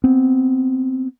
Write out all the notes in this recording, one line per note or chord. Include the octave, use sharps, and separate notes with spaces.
B3 C4